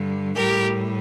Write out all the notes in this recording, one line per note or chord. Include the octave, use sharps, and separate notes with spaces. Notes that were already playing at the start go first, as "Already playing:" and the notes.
Already playing: G2 D3 G3
A2 G3 G4 A#4